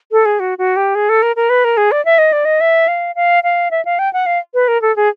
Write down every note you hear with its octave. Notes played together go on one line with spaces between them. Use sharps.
A4
G#4
F#4
F#4
G4
G#4
A4
A#4
A#4
B4
A#4
G#4
D5
E5
D#5
D5
D#5
E5
F5
F5
F5
E5
F5
G5
F#5
F5
B4
A#4
A4
G#4